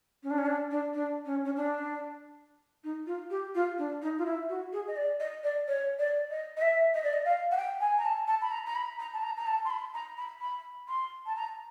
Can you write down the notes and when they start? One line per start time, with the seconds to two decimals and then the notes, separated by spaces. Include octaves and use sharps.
0.23 C#4
0.30 D4
0.38 C#4
0.46 D4
0.71 D4
0.94 D4
1.25 C#4
1.45 C#4
1.57 D4
2.84 D#4
3.06 F4
3.30 G4
3.55 F4
3.78 D4
4.02 D#4
4.18 F4
4.25 E4
4.49 F#4
4.73 G#4
4.88 D#5
4.96 D5
5.20 D#5
5.44 D5
5.68 C#5
5.99 D5
6.31 D#5
6.57 D#5
6.62 E5
6.94 D#5
7.03 D5
7.13 D#5
7.25 F5
7.51 F#5
7.57 G5
7.80 G#5
7.98 A#5
8.05 A5
8.27 A5
8.42 B5
8.51 A#5
8.66 A#5
8.75 B5
8.99 A#5
9.13 A5
9.23 A#5
9.37 A#5
9.46 A5
9.65 C6
9.70 B5
9.94 A#5
10.17 B5
10.41 B5
10.88 C6
11.26 A5
11.36 A#5